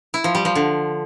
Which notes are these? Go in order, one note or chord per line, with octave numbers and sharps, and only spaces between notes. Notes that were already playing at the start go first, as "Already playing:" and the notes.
E4
F3
G3
F3
D3